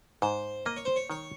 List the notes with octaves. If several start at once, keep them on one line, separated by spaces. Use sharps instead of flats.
G#2 C5
A#3 D#5
C#5
C5
C#5
D#3 C#5